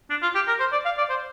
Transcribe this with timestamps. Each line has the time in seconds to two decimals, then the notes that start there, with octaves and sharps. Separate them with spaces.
0.10 D4
0.22 F4
0.35 G4
0.48 A#4
0.60 C5
0.72 D5
0.85 F5
0.98 D5
1.10 C5